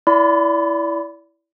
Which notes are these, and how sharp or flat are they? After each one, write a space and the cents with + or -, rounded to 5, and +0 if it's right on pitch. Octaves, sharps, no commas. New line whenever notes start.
E4 +0 D5 -30 B5 +45